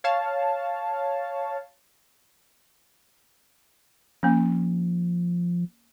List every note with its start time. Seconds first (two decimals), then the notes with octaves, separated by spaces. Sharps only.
0.04 C#5 F5 A5
4.23 F3 A#3 C#4